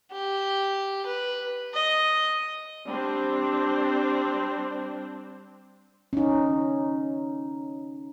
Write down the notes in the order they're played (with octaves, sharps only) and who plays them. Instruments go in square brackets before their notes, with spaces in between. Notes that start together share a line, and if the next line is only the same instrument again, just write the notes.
[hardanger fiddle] G4
B4
D#5
[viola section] G3 C4 D4 C5
[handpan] C#4 D#4